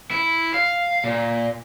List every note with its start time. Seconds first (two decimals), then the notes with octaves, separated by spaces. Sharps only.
0.11 E4
0.54 F5
1.04 A#2